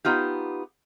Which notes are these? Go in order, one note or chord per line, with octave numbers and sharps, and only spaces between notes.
B3 D#4 F4 G4